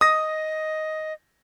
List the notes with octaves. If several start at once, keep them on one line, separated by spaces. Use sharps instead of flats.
D#5 D#6 A#6